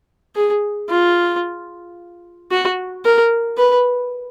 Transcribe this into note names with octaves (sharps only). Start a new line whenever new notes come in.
G#4
F4
F#4
A#4
B4